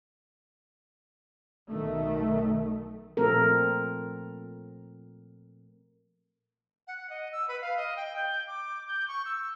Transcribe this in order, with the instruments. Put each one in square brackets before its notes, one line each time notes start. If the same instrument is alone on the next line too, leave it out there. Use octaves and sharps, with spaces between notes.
[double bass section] B1 D#3 A3
[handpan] A#2 F3 A3 C4 A4 A#4
[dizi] F#5
D#5
E6
B4
F5
D#5
G5
G6
D6
G6
C#6
E6